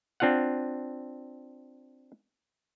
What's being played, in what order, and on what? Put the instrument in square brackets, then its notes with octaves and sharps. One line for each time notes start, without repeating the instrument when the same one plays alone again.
[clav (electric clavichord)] C4 D4 F4 F5 F#5